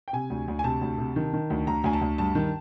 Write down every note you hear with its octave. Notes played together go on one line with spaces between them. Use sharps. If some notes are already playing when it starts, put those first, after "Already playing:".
G5
C3 G#5
D2
D2
G#5
C3 A5
D2
C3
D#3
D#3
D2
D2 A#5
D2 G#5
A5
D2
G2 A5
D#3